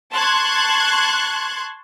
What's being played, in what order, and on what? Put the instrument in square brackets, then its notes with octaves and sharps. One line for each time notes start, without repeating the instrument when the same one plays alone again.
[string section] A5 C6 C#6 F#6 G#6